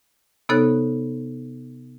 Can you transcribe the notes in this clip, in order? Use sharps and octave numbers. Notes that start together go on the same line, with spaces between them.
C3 B3 D#4 A4 C#5 F#6